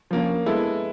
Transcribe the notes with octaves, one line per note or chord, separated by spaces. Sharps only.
F3 A#3 C#4
G#3 B3 E4 A4